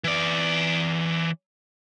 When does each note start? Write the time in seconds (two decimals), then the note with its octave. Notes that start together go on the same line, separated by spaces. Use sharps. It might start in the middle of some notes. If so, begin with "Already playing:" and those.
0.04 E3 D5